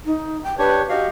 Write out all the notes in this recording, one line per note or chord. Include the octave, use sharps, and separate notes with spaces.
D#4
G5
D4 G4 B4 C#5
F#4 G4 D#5 F5